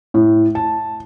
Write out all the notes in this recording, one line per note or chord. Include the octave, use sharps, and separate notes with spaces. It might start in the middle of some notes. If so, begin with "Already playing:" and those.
A2
A5